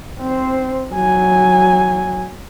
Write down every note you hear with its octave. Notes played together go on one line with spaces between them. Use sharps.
C4 C5
F#3 G#5